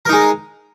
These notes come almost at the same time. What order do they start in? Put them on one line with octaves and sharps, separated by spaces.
A#4 D#4 G#3